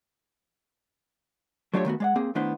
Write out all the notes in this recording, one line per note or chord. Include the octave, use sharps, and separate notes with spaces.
F#3 A3 D4 F4 G4 C#5
D#3 A3 B3 F#4
G#3 D5 F#5
A#3 C4 G#4
D#3 A3 B3 D4 E4 C5